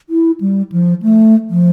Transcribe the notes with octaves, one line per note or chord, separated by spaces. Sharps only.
E4
G3
F3
A3
F3